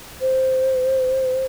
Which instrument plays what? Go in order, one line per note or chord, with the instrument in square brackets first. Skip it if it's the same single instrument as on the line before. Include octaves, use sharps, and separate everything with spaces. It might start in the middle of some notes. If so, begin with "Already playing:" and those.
[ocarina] C5